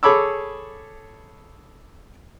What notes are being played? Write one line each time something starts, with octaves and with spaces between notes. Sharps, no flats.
G#4 A4 C#5 B5 D6 E6